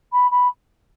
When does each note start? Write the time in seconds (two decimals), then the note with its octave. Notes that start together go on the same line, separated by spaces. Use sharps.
0.12 B5
0.31 B5